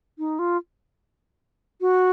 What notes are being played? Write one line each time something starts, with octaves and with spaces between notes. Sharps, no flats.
D#4
F4
F#4